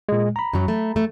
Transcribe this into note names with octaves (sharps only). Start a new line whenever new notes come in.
A#2 G#3
A#5 B5
F#2 F#3
A3
A3